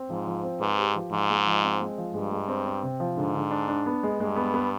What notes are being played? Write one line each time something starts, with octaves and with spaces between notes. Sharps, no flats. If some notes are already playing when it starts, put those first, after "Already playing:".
Already playing: C4
G#2 F3
F3
C4
G#2 B4
G4
F3
G#2 F3
G#3
F3
C4
G#3
F3
G2 G#3
G#3
C4
C4
C3
F3
G#2 D3
D3
D4
D4
B3
G#3
G2 G#3
B3
B3